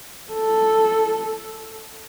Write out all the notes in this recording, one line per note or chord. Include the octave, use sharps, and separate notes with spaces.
A4